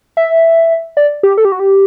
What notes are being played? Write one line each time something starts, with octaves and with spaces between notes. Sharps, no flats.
E5
D5
G4
A4
G4
F#4
G4